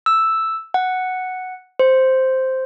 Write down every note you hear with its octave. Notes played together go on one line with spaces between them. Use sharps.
E6
F#5
C5